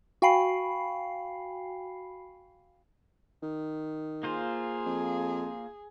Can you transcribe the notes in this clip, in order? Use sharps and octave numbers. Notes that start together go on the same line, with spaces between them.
F#4 F5 G5 G#5 B5 C7
D#3
A#3 F4 G#4 C5
F2